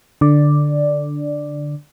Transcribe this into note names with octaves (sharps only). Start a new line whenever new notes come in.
D3 D5